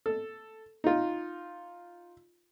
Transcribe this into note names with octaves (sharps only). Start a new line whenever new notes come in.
A4
D#4 F4